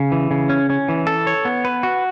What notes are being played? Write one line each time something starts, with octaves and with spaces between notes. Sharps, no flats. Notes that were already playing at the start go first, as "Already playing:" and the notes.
Already playing: C#3
E3
C#3
C#4
C#4
E3
A4
C#5
B3
B4
F#4